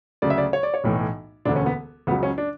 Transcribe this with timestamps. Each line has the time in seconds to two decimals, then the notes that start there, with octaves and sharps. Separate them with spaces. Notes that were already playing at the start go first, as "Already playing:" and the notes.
0.22 D2 C#3 F#3 D5
0.30 E5
0.38 D5
0.53 C#5
0.63 D5
0.74 C#5
0.84 B1 A2 E3
1.45 E1 D2 D3 D4
1.56 C#4
1.66 B3
2.07 C#2 C#3 F#3 B3
2.23 C#4
2.38 D4